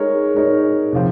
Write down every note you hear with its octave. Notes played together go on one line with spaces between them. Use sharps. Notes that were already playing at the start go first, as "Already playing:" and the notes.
Already playing: G#3 D#4 A#4 C#5
G#3 D#4 A#4 C#5
C3 F3 C4